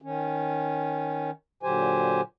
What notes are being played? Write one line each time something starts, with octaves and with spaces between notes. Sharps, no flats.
D#3 C#4
A#2 D3 F#3 G4 C5 G#5